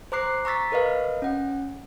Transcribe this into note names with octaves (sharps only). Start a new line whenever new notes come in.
C5 A#5 D6 F#6 C7
A#5 C#6 E6 A6 B6
A#4 B4 D#5 F5
C#4 F#5